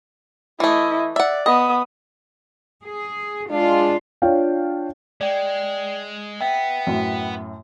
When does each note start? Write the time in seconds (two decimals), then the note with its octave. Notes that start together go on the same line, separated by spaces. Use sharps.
0.60 E3 A3 E4 D#5
1.16 D5 E5 F#5
1.46 B3 D#5 D#6
2.84 G#4
3.51 G#3 D4 F4
4.22 D4 F4 C#5 F5 G5
5.21 G#3 D5 G5
6.41 B3 E5 G5
6.87 F#2 A2